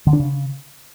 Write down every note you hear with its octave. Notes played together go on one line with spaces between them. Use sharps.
D3
D4
C#3